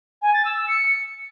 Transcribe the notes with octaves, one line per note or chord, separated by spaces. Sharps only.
G#5
A6
E6
E6
C#7